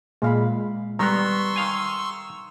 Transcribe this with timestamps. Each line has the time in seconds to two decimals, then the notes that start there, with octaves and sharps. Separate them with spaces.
0.22 A#2 G#3 A#3 F5 B5
0.99 D#3 G3 B3 A#5 C6 C#6 E6
1.56 D#3 F5 G#5